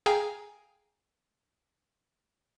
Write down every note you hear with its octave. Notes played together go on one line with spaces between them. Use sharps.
G#4 F5 G5 G#5 A#5